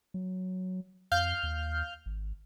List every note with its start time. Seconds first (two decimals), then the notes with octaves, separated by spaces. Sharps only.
0.14 F#3
1.12 F2 F5 F6 G6
1.43 D#2
2.06 G#1